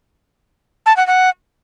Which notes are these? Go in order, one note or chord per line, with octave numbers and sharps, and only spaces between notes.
A5
F#5
F#5